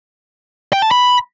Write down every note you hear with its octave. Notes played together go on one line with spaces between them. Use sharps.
G5
A5
B5